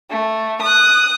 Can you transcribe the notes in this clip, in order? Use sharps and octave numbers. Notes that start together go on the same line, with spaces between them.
A3
D#6 F#6